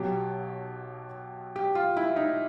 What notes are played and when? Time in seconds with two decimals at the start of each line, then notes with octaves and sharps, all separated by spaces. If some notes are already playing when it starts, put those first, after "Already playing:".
Already playing: B1 B2 F#3 G4
1.56 G4
1.75 F4
1.97 E4
2.16 D#4